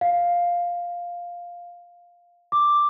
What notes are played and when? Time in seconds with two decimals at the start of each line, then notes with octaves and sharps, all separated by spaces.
0.01 F5
2.52 D6